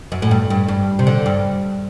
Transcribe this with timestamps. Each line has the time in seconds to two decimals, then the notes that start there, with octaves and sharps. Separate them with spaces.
0.12 F#2
0.22 A2
0.31 G2
0.50 G2
0.68 G2
0.99 C3
1.07 D3
1.26 G2